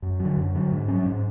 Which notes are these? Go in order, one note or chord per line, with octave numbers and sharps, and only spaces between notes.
F#2
F#3
D3
F#2
D3 F#3
G#2
F#3 C#4
G#2